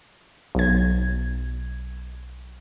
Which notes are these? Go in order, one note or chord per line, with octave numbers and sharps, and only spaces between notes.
B1 G#6